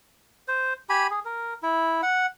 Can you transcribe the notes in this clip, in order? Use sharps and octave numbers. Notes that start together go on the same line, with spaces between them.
C5
G4 G#5 B5
G#4
A#4
E4
F#5